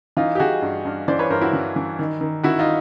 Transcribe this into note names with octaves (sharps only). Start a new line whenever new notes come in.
E3 D#4 F4
G4
E3 F#4 G#4
G2
G2
E3 C5 D5
B4 C#5
G2 A#4 C5
E4 F#4
E3
E3
D#3
D#3
D#3 E4 F#4
D#4 F4